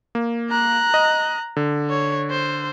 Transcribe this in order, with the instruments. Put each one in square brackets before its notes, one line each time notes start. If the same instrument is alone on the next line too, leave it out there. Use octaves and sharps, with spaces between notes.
[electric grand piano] A#3
[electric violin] A#5 F#6
[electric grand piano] D#5
D3
[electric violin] C#5
C5